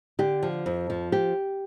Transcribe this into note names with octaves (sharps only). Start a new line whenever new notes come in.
D3 G4
F3
F2
F3
G4